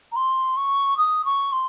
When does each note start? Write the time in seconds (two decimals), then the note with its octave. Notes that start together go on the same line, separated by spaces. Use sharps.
0.12 A#5
0.16 C6
0.57 C#6
0.97 D#6
1.25 C#6
1.52 C6